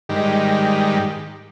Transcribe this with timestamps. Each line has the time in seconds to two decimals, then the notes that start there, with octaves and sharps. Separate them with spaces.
0.09 G#2 D#3 G3